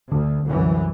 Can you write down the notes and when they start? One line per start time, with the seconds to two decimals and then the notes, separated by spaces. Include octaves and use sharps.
0.12 D2 D3
0.46 C2 F#2 E3